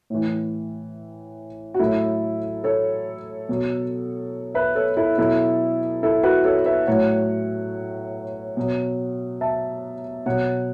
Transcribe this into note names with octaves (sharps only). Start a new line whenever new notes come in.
A2 E3
F#4
A2 F#3 E4 A4
A4 C#5
B2 F#3
B4 E5
A4 C#5
E4 A4
B2 F#3 E4 A4
E4 A4
F#4 B4
A4 C#5
B4 E5
A2 F#3 C#5 F#5
B2 F#3
E5 A5
B2 F#3 C#5 F#5